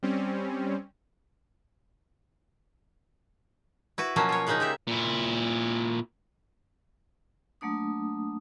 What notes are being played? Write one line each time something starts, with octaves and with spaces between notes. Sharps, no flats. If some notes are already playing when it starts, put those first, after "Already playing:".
G3 C4 C#4
E4 F#4 B4
B2 F3 F#3 A#3 C#4
F4 C#5
C#3 G#3 A#3 C#4 D#4
C#3 G4 E5
A#2 E4
F#3 A3 A#3 D4 D#6